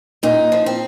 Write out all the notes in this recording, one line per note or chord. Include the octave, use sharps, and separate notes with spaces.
A#2 D#4
F3
C4